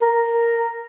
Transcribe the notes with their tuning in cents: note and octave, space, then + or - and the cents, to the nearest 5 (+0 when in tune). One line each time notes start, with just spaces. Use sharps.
A#4 -5